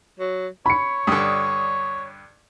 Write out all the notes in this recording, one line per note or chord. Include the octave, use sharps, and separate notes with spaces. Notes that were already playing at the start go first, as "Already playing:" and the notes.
F#3
C#5 B5 C#7
G2 D3 D#6